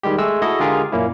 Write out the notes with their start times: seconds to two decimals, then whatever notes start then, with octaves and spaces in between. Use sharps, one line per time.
0.03 D#3 G3 G#3 G4
0.18 G#3 A3 E6
0.42 E4 F#4 G#4 A4 D#5
0.60 D3 G#3 F4 G4 G#4 A#4
0.92 F#2 A#2 A#3 C#4 E4